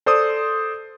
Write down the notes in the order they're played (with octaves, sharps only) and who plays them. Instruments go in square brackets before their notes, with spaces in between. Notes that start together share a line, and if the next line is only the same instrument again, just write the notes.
[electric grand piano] A4 C5 D5 C6 D#6